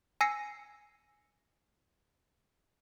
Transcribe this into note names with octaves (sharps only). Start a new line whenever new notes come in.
G#5 E6 A#6 C7 C#7